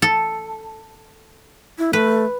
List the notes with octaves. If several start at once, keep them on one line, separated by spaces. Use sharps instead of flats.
A4
E4
A3 B4